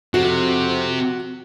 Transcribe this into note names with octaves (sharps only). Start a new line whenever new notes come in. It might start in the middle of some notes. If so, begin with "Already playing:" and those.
F2 C3 F#4